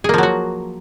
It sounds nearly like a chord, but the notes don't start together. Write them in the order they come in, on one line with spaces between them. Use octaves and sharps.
G#4 A#3 F3 F#3 F#4